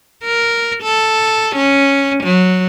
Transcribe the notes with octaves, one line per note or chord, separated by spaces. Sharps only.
A#4
A4
C#4
F#3